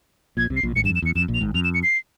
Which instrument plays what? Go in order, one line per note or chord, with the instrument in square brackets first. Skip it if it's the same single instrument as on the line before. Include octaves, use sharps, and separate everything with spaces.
[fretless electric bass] A#1 A#2 [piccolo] G#6
[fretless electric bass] C2 C3
[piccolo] C7
[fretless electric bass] A#1 A#2
[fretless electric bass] G#1 G#2 [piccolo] C#7
[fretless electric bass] G2 [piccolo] E7
[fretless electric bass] F2
[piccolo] E7
[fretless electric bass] E2 [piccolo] C#7
[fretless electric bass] F2 [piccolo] E7
[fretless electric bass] A#1 A#2
[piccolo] F7
[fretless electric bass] G#1 G#2
[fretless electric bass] F2 [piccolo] F7
[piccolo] E7
C#7
C7